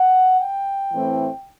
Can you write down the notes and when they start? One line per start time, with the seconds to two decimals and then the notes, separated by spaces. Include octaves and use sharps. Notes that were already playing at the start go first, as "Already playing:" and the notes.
Already playing: F#5
0.40 G5
0.92 A2 E3 A3 C4